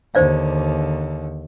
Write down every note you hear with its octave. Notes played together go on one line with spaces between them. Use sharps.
D#2 D3 C5 D5 F5